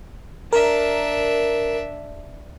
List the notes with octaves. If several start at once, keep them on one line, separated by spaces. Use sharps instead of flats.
D4 A#4 E5